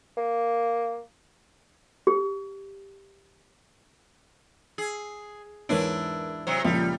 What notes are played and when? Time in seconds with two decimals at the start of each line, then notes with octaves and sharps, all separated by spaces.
0.17 A#3
2.07 G4
4.78 G#4
5.69 E2 G#2 D4 E4 A#4 B4 C#5 D7
6.47 C3 F#3 C5 C#7
6.64 C#2 A#2 F3 G3